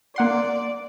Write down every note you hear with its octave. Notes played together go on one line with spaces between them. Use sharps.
A#3 D5 F#5 C6